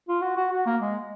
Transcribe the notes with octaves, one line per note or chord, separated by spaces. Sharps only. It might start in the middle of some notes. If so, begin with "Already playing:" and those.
F4
F#4
F#4
F#4
A#3
G#3